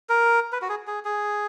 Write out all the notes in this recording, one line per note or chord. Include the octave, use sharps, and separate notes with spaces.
A#4
B4
F#4
G#4
G#4
G#4